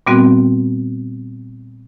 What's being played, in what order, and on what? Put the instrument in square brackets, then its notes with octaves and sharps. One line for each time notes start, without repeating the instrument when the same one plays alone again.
[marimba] A#2 G3 B3 C4 F#4